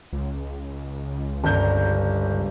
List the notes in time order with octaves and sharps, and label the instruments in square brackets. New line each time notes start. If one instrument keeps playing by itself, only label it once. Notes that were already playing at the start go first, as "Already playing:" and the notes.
[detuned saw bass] C#2
[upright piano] G1 G6 [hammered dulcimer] G2 C3 A#5